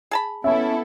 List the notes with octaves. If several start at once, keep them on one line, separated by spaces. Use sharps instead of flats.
G#4 A5 B5
B3 C#4 E4 A4 E5